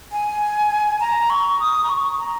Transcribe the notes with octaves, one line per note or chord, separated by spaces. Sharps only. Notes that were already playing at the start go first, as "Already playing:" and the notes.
G#5
A#5
C#6
D#6
A#5
C#6
A#5